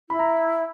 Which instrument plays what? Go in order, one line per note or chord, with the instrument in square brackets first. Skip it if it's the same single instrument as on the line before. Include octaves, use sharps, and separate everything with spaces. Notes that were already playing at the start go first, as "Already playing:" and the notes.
[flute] E4 [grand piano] B5
[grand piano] A#5